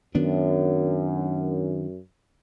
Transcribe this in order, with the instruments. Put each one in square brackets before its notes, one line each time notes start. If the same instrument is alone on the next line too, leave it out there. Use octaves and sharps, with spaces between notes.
[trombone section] F#2 [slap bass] D#3 B3 D4